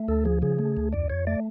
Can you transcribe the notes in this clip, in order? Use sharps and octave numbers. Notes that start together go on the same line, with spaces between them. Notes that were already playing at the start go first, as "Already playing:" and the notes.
Already playing: A3
D2 A4
F3 G#4
C#3 G#4
A3
D2
F2 D5
F2 C#5
A3 D5